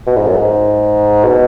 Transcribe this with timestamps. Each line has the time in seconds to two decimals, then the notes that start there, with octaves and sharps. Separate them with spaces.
0.07 B2
0.17 G#2
0.27 F#2
0.37 G#2
1.24 B2